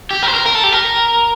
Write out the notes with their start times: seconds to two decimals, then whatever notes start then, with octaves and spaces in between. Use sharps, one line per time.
0.11 G4
0.23 A#4
0.28 C5
0.34 A#4
0.46 A#4
0.55 A4
0.64 G4
0.72 A#4